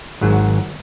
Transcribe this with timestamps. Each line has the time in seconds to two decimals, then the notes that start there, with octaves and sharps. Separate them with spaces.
0.21 G#1 G#2 F#3